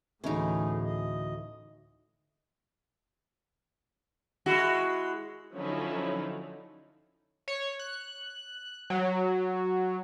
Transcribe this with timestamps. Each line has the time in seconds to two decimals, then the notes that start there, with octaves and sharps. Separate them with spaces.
0.24 D2 A2 E3 A3 C#4 D#4 G#4
0.84 D#5
4.46 G#3 E4 F#4
5.56 D3 F3 F#3 C#4 D#4 E4
7.48 C#5
7.79 F#6
8.90 F#3